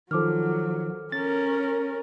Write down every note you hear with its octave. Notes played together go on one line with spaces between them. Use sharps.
D#3 F3 F#3 A4 D6 F6
C#4 A#4 A6